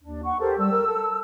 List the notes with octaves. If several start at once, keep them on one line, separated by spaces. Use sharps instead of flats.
D#2 D4
F#5 C#6
G4 A4 A#4 C5
G3 E6
A#4
A4